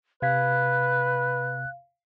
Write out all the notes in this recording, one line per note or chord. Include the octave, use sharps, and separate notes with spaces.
C3 B4 F5 F#6 G#6 B6